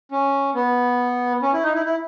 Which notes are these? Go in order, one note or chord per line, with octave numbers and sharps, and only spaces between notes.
C#4
B3
C#4
E4
D#4
E4
E4